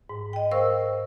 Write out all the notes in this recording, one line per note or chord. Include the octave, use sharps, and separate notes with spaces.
G#2
D#5 G5
A#4 C5 F5 C#6 E6